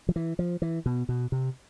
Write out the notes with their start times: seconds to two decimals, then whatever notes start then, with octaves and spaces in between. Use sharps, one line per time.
0.09 F3
0.16 E3
0.39 F3
0.62 E3
0.86 B2
1.09 B2
1.32 C3